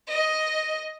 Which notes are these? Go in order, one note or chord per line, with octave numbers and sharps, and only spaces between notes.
D#5